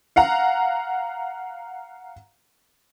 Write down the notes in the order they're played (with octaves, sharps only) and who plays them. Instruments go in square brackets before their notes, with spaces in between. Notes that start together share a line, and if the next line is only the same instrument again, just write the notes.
[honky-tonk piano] F5 F#5 A#5